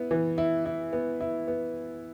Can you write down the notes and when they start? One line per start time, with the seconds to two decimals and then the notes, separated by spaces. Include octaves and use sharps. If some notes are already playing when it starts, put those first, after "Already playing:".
Already playing: B3 E4
0.11 E3
0.38 E4
0.66 E4
0.93 B3
1.20 E4
1.48 B3